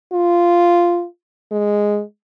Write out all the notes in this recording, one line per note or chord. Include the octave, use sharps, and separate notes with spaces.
F4
G#3